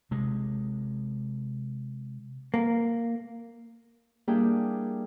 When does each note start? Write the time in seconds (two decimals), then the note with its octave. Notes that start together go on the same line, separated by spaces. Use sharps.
0.11 C3 G#3
2.54 A#3
4.27 G3 A#3 D4 E4 G#4 G5